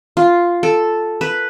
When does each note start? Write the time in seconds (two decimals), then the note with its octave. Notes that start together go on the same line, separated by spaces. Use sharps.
0.17 F4
0.63 A4
1.21 B4